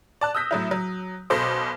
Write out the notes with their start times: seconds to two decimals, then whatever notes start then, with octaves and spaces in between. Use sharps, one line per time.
0.21 D5 A5 F#6
0.35 D#6 E6 G6 A#6 B6
0.51 A2 F#3 E4
0.71 F#3
1.30 B1 B2 A4 C5 D6